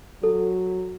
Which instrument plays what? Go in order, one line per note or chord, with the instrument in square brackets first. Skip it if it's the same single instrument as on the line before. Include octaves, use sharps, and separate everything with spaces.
[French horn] F#3 [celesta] A4